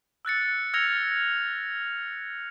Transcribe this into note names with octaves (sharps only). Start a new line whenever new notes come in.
E6 F#6 A6 C#7
E6 F6 G#6 A#6 C#7 F7